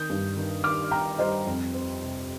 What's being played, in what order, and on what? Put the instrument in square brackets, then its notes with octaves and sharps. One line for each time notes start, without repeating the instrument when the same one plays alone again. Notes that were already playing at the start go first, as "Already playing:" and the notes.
Already playing: [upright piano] D#3 D#6 G6
G2
D#3
D#3 D6 F6
D#3 G5 A#5
G3 C5 D#5
F2
C4
C3